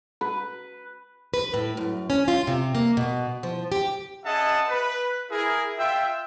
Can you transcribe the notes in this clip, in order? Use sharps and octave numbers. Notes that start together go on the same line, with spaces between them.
B4
B4
A2
F#2
C#4
F4
C3
A#3
B2
F3
G4
C#4 G#4 D#5 E5 F#5 A5
B4
E4 G#4 A#4
F4 E5 G5